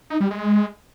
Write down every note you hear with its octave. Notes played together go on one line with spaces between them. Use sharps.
D#4
G3
G#3